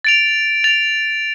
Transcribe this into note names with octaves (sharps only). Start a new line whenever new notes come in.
A6 D7 F7
A6 D7 F7